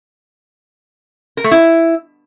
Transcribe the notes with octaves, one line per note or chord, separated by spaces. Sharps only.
A#4
A3
E4